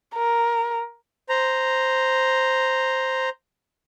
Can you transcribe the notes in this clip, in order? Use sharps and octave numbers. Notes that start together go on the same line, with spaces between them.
A#4
C5 A#5